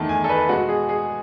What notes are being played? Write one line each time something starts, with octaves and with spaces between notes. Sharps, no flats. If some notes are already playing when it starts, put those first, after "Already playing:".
Already playing: E2 D#3 A3 A5
G#5
A4
B4
B2 G#3 F#4
G#4
G#4